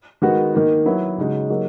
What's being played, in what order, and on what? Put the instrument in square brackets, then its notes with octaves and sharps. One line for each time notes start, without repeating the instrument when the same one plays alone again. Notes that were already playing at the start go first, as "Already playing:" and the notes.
[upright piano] D#3 G#3 B3 F#4
D#3 A#3 D#4
F#3 B3 E4 B4
C#3 G#3 D#4 F#4
F#3 A#3 D#4 G#4